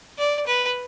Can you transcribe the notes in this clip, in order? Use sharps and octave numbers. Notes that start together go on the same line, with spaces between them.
D5
B4